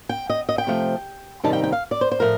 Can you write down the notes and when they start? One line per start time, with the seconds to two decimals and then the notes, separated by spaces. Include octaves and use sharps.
0.09 G5
0.30 D#5
0.49 D#5
0.58 G5
0.67 C3 F3 A3
1.44 C3 D#3 G3 C4 D#4 A5
1.53 G5
1.64 G5
1.72 F5
1.91 D5
2.01 C5
2.12 C5
2.20 A2 F3 A3 A#4